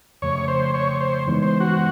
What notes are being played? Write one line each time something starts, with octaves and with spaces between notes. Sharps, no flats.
F2 C#3 F3 A3 C#5
C5
C#5
C5
G2 E3 G#3 B3 D#4
C5
F#4